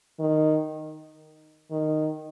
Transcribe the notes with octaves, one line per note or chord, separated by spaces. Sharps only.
D#3
D#3